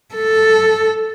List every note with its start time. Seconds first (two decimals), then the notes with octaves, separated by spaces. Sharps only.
0.15 A4